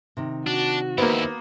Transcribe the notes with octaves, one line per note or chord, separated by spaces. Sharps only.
C3 D#3
D4 F#4
D#2 A#3 B3 D#4 E4 C5 D#5